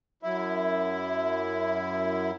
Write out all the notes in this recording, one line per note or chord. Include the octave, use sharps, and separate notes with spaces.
F#2 E4